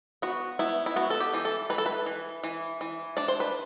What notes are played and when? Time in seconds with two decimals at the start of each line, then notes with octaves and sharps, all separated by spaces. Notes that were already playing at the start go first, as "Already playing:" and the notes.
0.22 B3 F#4
0.59 B3 E4
0.86 E4
0.96 B3 F#4
1.10 A4
1.20 G4
1.33 E3
1.45 A4
1.70 E3 B4
1.78 A4
1.86 B4
2.06 E3
2.44 E3
2.81 E3
3.17 D4 D5
3.28 C5
3.40 B4